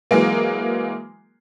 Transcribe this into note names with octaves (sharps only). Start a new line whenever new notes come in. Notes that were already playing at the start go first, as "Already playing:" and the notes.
E3 F#3 G#3 A#3